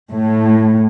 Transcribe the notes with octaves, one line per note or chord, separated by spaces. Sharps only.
A2